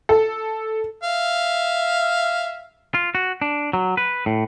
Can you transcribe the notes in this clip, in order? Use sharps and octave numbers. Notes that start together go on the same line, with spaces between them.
A4
E5 F5
F4
F#4
D4
F#3
B4
A2